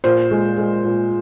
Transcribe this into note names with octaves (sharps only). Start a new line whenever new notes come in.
A#2 C5
G#3
G#3
A#2